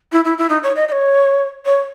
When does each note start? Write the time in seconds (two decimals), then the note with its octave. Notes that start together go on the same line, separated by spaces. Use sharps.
0.12 E4
0.25 E4
0.38 E4
0.49 D#4
0.63 C#5
0.76 D#5
0.88 D#5
0.92 C#5
1.65 C#5